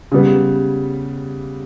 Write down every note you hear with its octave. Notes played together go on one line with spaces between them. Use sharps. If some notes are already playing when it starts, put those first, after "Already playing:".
C#3 G3 B3